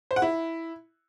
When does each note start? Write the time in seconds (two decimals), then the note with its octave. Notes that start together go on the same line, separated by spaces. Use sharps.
0.11 C5
0.16 F#5
0.22 E4